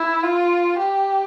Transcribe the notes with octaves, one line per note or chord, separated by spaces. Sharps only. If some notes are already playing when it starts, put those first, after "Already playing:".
Already playing: E4
F4
G4